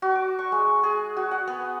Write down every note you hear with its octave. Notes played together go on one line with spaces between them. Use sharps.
F#4
D6
C#6
G#3
G#4
F#4
F#5
B3